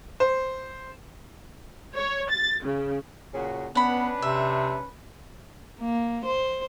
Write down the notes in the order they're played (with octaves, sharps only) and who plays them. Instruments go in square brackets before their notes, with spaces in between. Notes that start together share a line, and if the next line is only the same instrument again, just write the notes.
[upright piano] C5
[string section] C#5
A6
C#3
[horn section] A#2 C#3 F#4
[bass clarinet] B3 [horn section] C#4 D4 B4 [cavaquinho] F#5 B5
[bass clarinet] C3 [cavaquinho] E5
[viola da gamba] A#3
C5